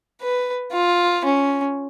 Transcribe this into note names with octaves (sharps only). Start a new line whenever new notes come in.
B4
F4
C#4